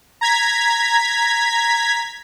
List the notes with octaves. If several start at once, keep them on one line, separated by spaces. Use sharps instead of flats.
A#5 G#6 B6